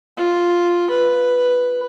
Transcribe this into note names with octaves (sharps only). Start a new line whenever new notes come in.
F4
B4